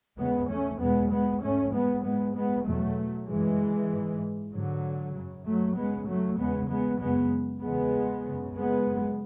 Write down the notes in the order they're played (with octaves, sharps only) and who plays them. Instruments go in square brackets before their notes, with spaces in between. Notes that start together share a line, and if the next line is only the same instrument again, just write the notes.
[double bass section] E2 C#3 G#3 B3
A3 C#4
E2 B2 G#3 B3
G#3 B3
G#2 A3 C#4
G#3 B3
G#2 G#3 B3
G#3 B3
E2 B2 F#3 A3
F#2 C#3 E3 G#3
G#2
G#2 D3 F#3
F#2 C#3
F#3 A3
F#2 C#3 G#3 B3
F#3 A3
E2 C#3 G#3 B3
G#3 B3
F#2 C#3 G#3 B3
E2 C#3 G#3 B3
F#2 C#3
G#3 B3
F#2 C#3